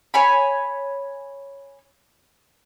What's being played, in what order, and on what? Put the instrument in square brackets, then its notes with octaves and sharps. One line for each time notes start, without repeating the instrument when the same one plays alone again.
[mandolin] C#5 G#5 B5